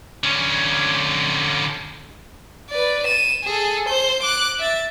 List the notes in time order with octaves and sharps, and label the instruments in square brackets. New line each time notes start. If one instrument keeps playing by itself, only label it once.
[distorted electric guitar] D3 C#4
[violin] B4 D5
D#7 E7
G#4 A4
C5 G6
D6 F#6
E5 A6